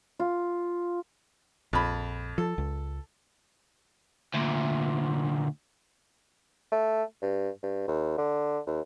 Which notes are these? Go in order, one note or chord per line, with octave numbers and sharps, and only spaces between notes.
F4
A#1 F2 B5
F3 A4
C#2
D2 A#2
A3
G2
G2
D#2
D3
D#2